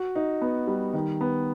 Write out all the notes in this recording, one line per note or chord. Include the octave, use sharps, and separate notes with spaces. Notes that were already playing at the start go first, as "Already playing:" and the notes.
Already playing: F#4
D#4
B3
G3
D#3
B3